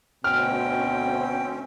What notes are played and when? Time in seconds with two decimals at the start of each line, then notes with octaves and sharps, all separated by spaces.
0.24 D2 B2 C4 C#4 G5 F6